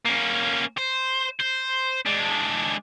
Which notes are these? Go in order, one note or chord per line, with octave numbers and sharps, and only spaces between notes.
A#3 C#4
C5
C5
G#3 D4